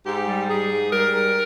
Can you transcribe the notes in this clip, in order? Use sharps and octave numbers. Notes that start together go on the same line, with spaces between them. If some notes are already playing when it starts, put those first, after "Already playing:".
G#2 G4
G3
G#2 G#4
G#2
G3 A#4
G#2